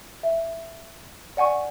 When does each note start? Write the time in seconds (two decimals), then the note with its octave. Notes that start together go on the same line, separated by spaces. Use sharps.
0.23 E5
1.37 D5 F#5 G#5 C#6